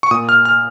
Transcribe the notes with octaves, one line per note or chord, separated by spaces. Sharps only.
C#6
A#2 D#6
F6
F6